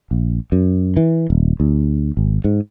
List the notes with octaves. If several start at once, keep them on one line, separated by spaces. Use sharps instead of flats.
A#1
F#2
E3
D#1
D2
G#1
G#2